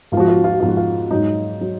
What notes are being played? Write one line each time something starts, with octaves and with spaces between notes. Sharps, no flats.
G#2 F4
F3 F#4
F4
F#4
F4
F#4
G#2 F3 F4
F#4
F4
G#2 F#3 D#4
F#3